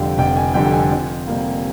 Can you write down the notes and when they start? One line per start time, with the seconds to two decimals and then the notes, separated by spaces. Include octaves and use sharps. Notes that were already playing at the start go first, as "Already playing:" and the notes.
Already playing: F1 F2 D3 G3 F5 G5
0.18 F1 G5
0.37 G#5
0.54 F2 D3 G3 G5
0.65 G5
0.72 G#5
0.91 F2
1.27 C3 G3 A#3